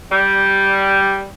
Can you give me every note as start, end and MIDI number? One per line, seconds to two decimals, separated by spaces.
0.11 1.27 55